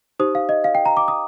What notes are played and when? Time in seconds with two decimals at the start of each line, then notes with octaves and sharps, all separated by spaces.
0.19 D#4 G4 C5 D#6
0.35 F5
0.49 D#5
0.64 F5
0.75 G5
0.86 A#5
0.97 D6
1.08 D#6